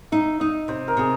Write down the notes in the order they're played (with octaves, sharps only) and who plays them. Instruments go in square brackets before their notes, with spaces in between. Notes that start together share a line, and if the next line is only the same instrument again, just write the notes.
[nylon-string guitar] D#4 [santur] E5
[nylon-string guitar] D#4 [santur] D#5
[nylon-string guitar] C3 [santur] C5
[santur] A#4
[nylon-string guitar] C3 [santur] G#4